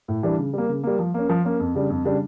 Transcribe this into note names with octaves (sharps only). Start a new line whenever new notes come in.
A2
E3 G3 D4
C#3
G3 A#3
C#3
G3 A#3
F3
A#3 C#4
F3
A#3 C#4
F2
C#3 G3 D4
F2
C#3 G3 D4